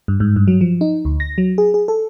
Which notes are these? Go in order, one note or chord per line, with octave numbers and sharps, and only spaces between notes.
G2
G#2
G2
F#3
F3
D#4
D2
A#6
F#3
G#4
G#4
A4